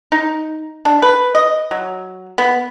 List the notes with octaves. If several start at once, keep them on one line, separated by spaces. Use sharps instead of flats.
D#4
D4
B4
D#5
F#3
B3